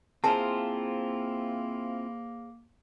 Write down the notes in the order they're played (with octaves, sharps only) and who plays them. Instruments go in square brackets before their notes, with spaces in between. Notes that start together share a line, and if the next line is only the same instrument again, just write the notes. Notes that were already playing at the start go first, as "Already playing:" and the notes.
[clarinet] A#3 [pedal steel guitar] C4 E4 F4 [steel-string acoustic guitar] G#4 A#4 C5 [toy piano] A5